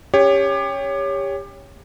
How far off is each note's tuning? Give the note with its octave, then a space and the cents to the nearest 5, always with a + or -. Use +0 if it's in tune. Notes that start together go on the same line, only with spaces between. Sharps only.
C#4 +0 G4 +25 C#5 +10